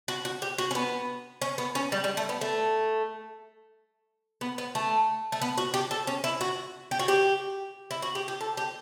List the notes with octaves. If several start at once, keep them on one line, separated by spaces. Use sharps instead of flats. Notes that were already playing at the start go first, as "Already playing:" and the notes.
F#4
F#4
G4
F#4
C#4
B3
C#4
B3
C#4
G3
G3
A3
B3
A3
B3
B3
A3
A3
B3
F#4
G4
A4
C#4
E4
F#4
G4
F#4
G4
E4
F#4
G4
G4
A4
G4